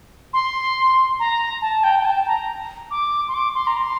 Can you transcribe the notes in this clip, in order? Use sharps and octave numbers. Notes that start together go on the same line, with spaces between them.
C6
A#5
A5
A5
G5
G5
A5
A#5
D6
C6
D6
C6
A#5
C6